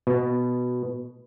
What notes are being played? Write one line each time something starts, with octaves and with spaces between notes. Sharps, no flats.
B2